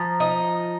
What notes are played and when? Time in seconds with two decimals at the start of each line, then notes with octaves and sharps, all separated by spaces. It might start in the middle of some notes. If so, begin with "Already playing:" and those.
Already playing: F3 A#5
0.20 D#4